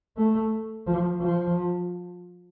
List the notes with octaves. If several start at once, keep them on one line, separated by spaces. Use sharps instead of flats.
A3
F3
F3